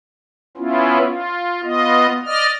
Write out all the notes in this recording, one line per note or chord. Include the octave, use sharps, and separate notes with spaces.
B3 C#4 E4 F4
F4
B3 F4 D#5
D5 D#5 F6